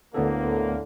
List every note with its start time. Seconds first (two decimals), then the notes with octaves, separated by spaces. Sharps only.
0.14 D2 A2 D3 A#3 B3 A4